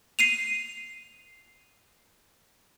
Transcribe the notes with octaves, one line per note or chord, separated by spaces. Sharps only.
C7 D#7 F7